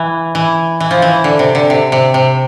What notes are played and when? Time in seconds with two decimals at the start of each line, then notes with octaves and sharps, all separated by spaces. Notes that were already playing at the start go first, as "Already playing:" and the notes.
Already playing: E3
0.35 E3
0.80 E3
0.91 F3
1.02 E3
1.24 D3
1.39 C3
1.55 D3
1.70 C3
1.92 C3
2.14 C3